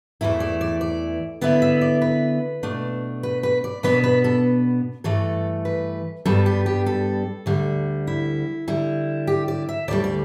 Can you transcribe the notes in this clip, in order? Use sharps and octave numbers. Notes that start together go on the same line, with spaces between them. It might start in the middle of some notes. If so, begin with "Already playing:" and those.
E2 E3 A3 E4 A4
D5
D5
D5
D3 B3 E4 D5
E5
D5
B4
B2 A3 D4
B4
B4
D5
B2 B3 D4 B4
B4
A4
G2 E3 A3 A4
B4
G2 G3 B3 D4 A4
G4
G4
A4
D2 D3 G3
E4
D3 G3 E4
G4
D5
E5
D2 D3 G3 D5
D5